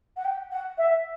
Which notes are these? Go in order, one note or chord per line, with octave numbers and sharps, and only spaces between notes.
F#5
G5
F#5
E5